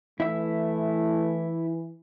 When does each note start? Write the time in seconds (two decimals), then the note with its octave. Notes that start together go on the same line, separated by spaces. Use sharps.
0.20 E3 A3 E4 E5